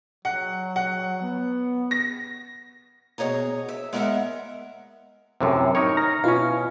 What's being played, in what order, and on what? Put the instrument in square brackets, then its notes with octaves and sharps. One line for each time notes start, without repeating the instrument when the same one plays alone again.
[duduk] F#3 [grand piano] F#5
[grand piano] F#5
[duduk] B3
[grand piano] A#6
[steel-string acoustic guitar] B2 G#4 C#5 D#5 A#5
E5
G#3 B3 A#4 C5 E5 F#5
[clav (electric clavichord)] F#2 A2 C3
D#4 A#4 C#5
[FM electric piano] A#5 F6 A#6
[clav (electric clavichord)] B2 C#4 [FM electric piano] E4 F4 F5